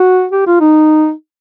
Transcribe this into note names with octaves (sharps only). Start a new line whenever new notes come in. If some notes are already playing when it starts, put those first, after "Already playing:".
Already playing: F#4
G4
F4
D#4